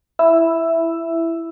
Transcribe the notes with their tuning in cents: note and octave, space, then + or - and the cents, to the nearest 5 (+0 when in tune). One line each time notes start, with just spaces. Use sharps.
E4 +0 E6 +5